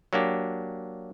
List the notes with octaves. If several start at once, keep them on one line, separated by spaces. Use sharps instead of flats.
F#3 A#3 D4 G4